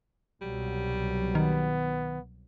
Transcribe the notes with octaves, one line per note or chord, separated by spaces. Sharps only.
C2 B2 F#3 G3
D#3 B3